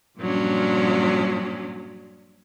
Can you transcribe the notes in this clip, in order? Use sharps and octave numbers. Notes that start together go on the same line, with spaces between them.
G2 A#2 F3 F#3 C#4 D4